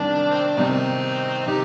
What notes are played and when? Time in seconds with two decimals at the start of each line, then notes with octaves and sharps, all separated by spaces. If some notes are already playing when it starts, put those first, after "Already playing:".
Already playing: C2 C3 D#3 D4
0.30 C4
0.44 D4
0.57 C2 C3 D#3 C4 D#4
1.47 C3 D#3 D#4 G4